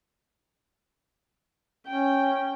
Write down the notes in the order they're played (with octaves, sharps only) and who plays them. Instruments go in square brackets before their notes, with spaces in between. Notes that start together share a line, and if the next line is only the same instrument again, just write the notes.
[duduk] C#4 [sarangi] G5